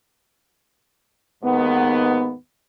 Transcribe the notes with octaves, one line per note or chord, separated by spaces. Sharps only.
D#2 G#2 D#3 B3